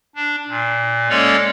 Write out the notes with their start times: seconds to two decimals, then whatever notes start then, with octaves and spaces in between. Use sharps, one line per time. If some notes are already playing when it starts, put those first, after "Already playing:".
0.16 D4
0.49 A#2
1.09 G#3 A#3 C#4 A4 C#5 D5